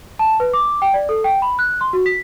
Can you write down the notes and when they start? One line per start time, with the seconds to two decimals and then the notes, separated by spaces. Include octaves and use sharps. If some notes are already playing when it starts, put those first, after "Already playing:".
0.19 A5
0.40 B4
0.54 D6
0.82 G5
0.94 D5
1.09 A4
1.24 G5
1.42 B5
1.59 F#6
1.81 C6
1.93 F#4
2.06 B6